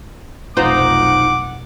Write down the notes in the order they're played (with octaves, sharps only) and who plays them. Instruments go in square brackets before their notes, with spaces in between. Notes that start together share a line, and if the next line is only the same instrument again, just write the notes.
[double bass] F1 B1 [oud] D#4 F4 C5 [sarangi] F#5 [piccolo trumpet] D6